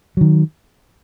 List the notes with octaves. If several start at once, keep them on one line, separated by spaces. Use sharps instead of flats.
D#3 F#3